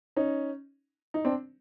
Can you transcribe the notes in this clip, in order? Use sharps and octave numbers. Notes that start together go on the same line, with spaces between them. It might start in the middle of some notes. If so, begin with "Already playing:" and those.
C#4 D#4
D#4
C4 D4